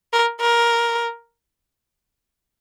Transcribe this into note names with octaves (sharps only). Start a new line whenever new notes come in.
A#4
A#4